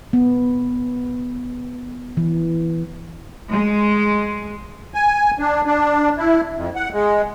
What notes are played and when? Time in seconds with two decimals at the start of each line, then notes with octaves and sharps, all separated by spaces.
0.13 B3
2.17 E3
3.49 G#3
4.94 G#5
5.39 D4
5.66 D4
6.18 E4
6.56 F2
6.75 F#5
6.93 G#3